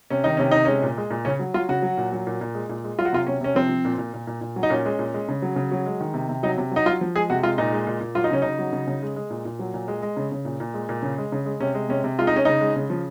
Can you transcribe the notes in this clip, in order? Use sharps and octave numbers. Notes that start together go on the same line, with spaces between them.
C3 C#4
D#3 D#4
C3 C#4
C3 D#4
G#3 C#4
A#2
G#3
A#2
C#3 C#4
F#3
F#3 F4
C#3 F#4
F#3
A#2
F#3
A#2
A#2
G#3
A#2
G#3
F#3 F4
F#4
C3 F4
C3 C#4
C3 C#4
F3 C4
F3
A#2
A#2
A#2
A#2
A#2
F#3
D#4
A#2 C#4
G#3
A#2
G#3
C#3
F#3
C#3
F#3
G#3
D#3
C3
C3
F#3 D#4
C3
F#3 D#4
F#3 F4
F3
G#3 G#4
C3 F#4
G#3 F4
A#2 D#4
G#3
A#2
A#2
F#3 F4
D#4
C#3 C#4
C#3 D#4
F#3
C#3
C#3
G#3
G#3
A#2
A#2
F#3
A#2
G#3
G#3
C#3
C#3
A#2
A#2
G#3
A#2
C#3
G#3
C#3
G#3
C3 C#4
G#3
C3 C#4
C3
G#3 F4
D#4
G#3 C#4
C#3 D#4
G#3
C#3
F3